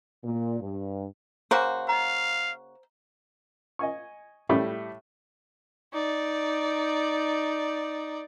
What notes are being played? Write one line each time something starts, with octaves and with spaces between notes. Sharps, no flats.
A#2
G2
C#3 A#3 F#4 C5
D#5 F5 A#5
D#5 G#5 C#6
A2 G3 A3 B5 D6
D#4 D5